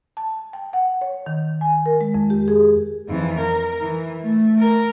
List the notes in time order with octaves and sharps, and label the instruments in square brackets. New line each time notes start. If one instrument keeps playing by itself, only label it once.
[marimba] A5
G5
F#5
C#5
D#3
G#5
A#4
G#3
F2
G4
G#4
[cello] F2 E3
A#4
E3
A3
A#4